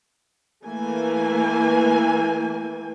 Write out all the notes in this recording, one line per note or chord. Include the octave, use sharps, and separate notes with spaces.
E3 A3 A#3 G#5